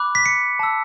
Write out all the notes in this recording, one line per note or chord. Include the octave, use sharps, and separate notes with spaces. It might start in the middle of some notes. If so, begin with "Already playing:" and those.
Already playing: B5 D6 F#6
B6
C#7
A5 E6